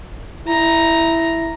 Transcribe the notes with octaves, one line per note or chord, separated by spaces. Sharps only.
E4 A#5